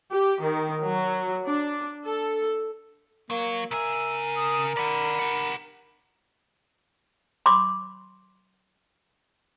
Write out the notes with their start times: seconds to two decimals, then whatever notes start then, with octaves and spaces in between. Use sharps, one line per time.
0.11 G4
0.41 D#3
0.84 F#3
1.45 D4
2.05 A4
3.30 F#3 A#3
3.71 C#3 A#4 E5 G#5
4.36 D#6
4.77 D5 F#5 B5
5.19 G4 F#5
7.46 B5 C6 D6